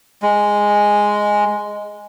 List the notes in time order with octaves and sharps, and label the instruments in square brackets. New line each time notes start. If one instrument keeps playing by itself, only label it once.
[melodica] G#3